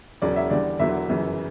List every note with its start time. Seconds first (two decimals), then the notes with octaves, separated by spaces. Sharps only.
0.22 E1 E2 C#3 F#3 C#4 D5
0.36 E5
0.50 E2 D3 G3 D5
0.79 E1 E2 D3 F#3 E5
1.08 G1 F#2 C#3 E3